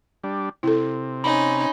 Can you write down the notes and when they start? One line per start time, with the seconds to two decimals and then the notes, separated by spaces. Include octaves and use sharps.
0.24 G3 D4
0.63 C3 E4 A4
1.24 C#4 D#4 B5